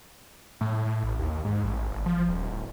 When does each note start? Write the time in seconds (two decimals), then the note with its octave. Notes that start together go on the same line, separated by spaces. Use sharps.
0.61 A2
0.85 A2
1.04 A1
1.19 D#2
1.44 G#2
1.64 A1
1.90 G1
2.06 F3
2.29 D#1
2.51 D1